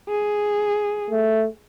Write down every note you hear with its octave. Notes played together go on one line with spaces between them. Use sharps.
G#4
A3